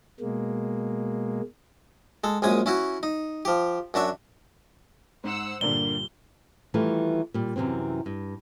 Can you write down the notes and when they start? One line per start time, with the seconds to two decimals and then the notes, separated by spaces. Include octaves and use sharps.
0.20 B2 G#3 A#3
2.24 G#3 A4
2.42 A#1 F#2 G#3 G#5 D#6
2.66 C#4 E4 F#4
3.03 D#4
3.45 F3 G4
3.94 F#2 D4 F#4 E5
5.24 G#2 C5 F#5 E6
5.61 G2 A#2 D3 G3 A#3 D4 G7
6.74 D#3 E3 G3 A3 F4
7.34 A#2 G3
7.56 F#2 C3 E3 C4
8.06 G2